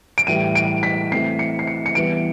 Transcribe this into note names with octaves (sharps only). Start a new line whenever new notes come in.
D7
A2 E3 G3 D#7
D7
B6
E3 A3 C4 C7
C#7
C7
C#7
C#7
E3 G3 B3 D7